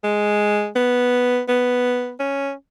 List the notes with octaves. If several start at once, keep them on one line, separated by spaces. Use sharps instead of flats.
G#3
B3
B3
C#4